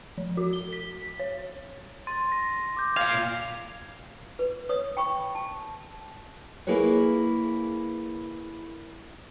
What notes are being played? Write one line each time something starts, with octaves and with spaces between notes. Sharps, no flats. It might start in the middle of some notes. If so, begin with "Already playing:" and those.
F3
F#4
G7
B6
C#5
C6 A6 D#7
A#6
D6 G6
A#2 F5 G#6 C7
B4
B4 C#5 D#6
G5 B5 C#6
A5
A#3 E4 G#4 B4 C#5